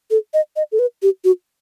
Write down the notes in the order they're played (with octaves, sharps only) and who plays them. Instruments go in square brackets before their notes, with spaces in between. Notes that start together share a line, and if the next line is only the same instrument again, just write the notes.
[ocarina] A4
D#5
D#5
A4
B4
G4
F#4